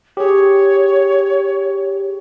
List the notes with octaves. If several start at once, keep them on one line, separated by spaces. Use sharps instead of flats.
G4 G#4 C#5